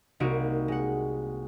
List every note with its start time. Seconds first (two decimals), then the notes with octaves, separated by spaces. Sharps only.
0.20 C2 A#3 D#4 F#4 D7
0.68 G#3 F#5